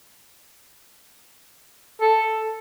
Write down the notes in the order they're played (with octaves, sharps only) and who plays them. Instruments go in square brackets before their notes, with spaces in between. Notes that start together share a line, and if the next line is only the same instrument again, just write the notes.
[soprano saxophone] A4